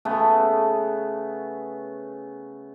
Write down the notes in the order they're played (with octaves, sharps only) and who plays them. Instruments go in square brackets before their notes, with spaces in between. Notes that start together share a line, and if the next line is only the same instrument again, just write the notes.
[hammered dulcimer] C#3 A3 B3